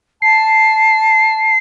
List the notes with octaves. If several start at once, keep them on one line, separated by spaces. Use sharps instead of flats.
A5 C7